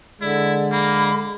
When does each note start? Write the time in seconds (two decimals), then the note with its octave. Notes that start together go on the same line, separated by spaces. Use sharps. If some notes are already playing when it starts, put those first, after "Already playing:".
0.22 D3 G#3 E4 D5
0.72 A#3 B5